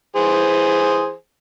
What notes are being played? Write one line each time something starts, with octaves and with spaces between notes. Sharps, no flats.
E3 G#4 C5